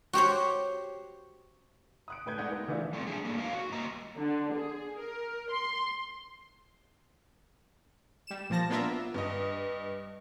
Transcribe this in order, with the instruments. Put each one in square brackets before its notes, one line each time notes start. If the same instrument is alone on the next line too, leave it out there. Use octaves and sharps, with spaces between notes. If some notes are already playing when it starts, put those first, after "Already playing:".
[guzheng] F#4 G4 C5 C#5
[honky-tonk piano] D#6 F#6 D7
A2 A3 B4 G6 G#6
G#3 A3 D#4 D5 F#5
B3 D#4
D#3 E3 A3 D4 E4 F4
[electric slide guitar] G3 A3 B3 C4
D4 G#4
A#3 D4 D#4 A4
F#3 A#4 E5 F5
F#4
G3 A#3 D#5 A#5
[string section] D3
G#4
A#4
C6
[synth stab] G3 E7
A#2 F3 A5 A#6
A#3 B3 D4 F4 A#4 E5
[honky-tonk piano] G2 D#5